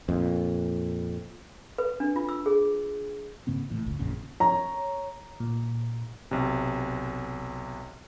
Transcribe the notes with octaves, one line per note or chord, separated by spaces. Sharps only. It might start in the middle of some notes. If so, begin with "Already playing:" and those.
F2 A#2
B4
D4
F4
E6
G#4
G#2 C#3 A#3 C4
A2 E3
G1 C#2
A1 F2 A#2 C#3
C#5 A#5
A#2
B1 C3